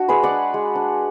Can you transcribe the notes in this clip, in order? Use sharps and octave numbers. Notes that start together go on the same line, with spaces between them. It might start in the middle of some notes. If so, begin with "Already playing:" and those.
Already playing: D4 F#4
G#3 G#4 B4
D5 F#5
D4
G#3
D4